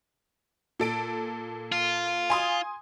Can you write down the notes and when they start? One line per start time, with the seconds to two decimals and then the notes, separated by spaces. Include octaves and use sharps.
0.80 A#2 A4 D7
1.72 F4
2.30 G#5 C6 D#6